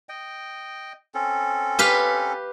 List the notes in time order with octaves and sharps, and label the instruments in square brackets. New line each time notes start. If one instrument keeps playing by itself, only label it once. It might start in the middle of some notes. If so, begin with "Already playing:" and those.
[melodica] D#5 G5
C4 C#4 A4
[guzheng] G4 B4 F5